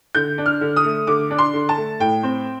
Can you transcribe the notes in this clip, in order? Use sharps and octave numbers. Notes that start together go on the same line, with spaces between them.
D3 G6
D4
F6
D3
D#6
A3
D3 D6
D4
C6
D3
A5
A3
A2 G5
C4